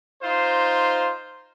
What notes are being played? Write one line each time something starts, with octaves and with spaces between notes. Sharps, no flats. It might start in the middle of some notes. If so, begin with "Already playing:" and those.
D#4 F4 C5